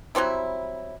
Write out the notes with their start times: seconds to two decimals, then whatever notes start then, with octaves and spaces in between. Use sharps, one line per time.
0.15 F#3 G3 C4 E4